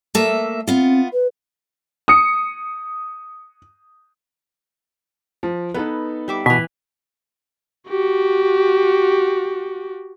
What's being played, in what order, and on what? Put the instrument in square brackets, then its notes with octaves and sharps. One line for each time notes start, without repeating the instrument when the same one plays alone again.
[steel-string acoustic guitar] A3 A#3 E5
[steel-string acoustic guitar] B3 F4 [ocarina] C4
[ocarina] B4
[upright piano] D#6 C#7
[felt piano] F3
[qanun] B3 [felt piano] D#4 A4 B4
[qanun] G3 E5 D6
[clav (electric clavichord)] B2 [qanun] E3 G#5 [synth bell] B6
[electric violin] F#4 G4